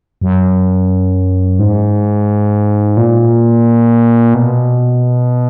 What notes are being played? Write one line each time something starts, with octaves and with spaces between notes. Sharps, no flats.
F#2
G#2
A#2
B2